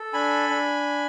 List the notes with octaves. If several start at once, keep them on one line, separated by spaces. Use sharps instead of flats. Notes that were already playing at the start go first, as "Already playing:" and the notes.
Already playing: A4
D4 G#5 B5
D4